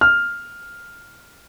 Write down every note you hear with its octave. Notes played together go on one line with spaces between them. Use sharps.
F6